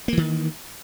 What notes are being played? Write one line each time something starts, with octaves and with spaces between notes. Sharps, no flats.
D#3 E3 A#3